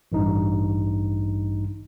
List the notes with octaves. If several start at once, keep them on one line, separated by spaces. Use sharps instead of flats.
A1 G2 D#4